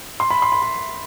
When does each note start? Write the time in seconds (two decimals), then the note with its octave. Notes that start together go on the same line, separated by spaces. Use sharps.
0.20 C6
0.30 B5
0.42 C6
0.52 B5
0.62 B5